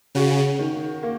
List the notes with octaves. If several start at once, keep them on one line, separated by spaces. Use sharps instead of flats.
C#3 F#4
D#3
A#3